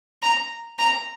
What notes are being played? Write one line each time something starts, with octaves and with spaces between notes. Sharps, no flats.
A#5
A#5